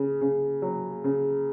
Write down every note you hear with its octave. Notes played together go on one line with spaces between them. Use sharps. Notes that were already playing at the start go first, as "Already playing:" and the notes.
Already playing: C#3
C#3
F#3
C#3